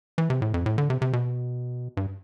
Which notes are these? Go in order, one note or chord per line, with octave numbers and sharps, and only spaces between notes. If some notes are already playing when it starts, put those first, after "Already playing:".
E3
C3
A2
F2
A2
D3
C3
C3
B2
G2